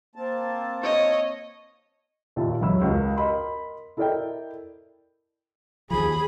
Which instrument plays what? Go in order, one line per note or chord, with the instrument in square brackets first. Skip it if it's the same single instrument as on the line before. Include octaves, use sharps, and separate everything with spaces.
[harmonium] A#3 C4 A5
[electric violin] C#5 D#5
[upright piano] D#2 A#2 F#4 E5 A5
E1 B1 F#3 C#5 B5 E6
C#2 F#4 A#4 A5
A#4 D#5 B5 C6
E4 A4 A#4 D5 D#5 G5
[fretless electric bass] D#2 F3 [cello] G#4 [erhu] B5